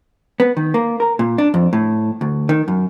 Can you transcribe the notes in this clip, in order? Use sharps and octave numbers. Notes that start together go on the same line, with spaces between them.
B3
D#3
A#3
A#4
A#2
D4
F2
A2
D2
D#3
F#2